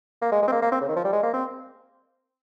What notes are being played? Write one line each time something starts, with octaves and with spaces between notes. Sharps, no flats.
A#3
G#3
G#3
C4
A#3
A#3
C4
C#3
D#3
F3
G3
G#3
A#3
C4